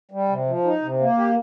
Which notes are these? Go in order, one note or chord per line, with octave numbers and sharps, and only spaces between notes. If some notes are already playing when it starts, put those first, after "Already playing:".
G3
C3
F3
D#4
C3
A#3
G4